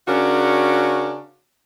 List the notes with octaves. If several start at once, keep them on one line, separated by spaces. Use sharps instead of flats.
C#3 C#4 D4 F#4 A#4